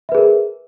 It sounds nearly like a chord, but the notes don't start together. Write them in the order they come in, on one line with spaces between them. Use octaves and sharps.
E5 B4 G#4 A#4